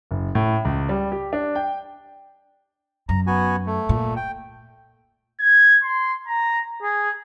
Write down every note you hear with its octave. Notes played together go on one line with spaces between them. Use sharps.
F#1
A2
C#2
G3
G4
D4
G5
F#2 A#5
B3 F#4 G#5
A3
A#2
G5
G#6
C6
A#5
G#4